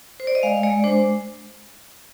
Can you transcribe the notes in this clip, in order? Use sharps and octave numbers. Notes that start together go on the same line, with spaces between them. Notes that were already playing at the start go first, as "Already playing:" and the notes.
C5
D5
D#5
G#3 F5
G#3 D5
D4 C5